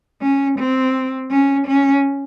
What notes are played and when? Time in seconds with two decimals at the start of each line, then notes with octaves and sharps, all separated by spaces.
0.21 C#4
0.58 C4
1.31 C#4
1.67 C#4